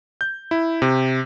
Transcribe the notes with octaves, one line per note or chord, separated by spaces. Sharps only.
G6
E4
C3